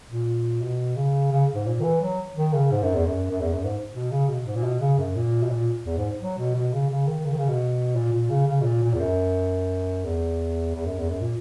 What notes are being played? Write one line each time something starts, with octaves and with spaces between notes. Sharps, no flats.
A#2
B2
C#3
C#3
G#2
A#2
D#3
E3
F#3
D#3
C#3
G#2
F#2
E2
F#2
F#2
E2
F#2
G#2
B2
C#3
B2
G#2
A#2
B2
C#3
F#2
A#2
B2
A#2
E2
G#2
F#3
B2
B2
C#3
C#3
D#3
C#3
D#3
C#3
B2
A#2
A#2
C#3
C#3
B2
A#2
A#2
E2
F#2
E2
E2
F#2
E2
F#2
A#2